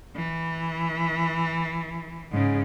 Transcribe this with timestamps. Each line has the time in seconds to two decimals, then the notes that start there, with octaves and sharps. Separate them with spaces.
0.16 E3
2.31 G#2 C#3